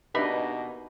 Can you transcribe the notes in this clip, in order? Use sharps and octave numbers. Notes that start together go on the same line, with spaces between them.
B2 A#3 D4 D#4 G4 B4 E5 B5